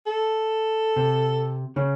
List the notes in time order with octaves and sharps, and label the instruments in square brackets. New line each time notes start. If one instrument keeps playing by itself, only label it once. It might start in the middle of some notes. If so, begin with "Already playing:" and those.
[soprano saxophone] A4
[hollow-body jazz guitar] C3
C#3 C#4